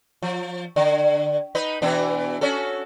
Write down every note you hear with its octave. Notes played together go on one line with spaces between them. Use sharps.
F3
D3
D#4 B4
B2 E3 D4
C#4 F#4 A4